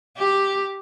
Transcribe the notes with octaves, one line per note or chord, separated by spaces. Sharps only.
G4